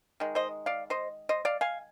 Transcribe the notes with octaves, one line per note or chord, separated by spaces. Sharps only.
D#3 G#3
C5 D#5
D5 F5
C5 D#5
C5 D#5
D5 F5
F5 G#5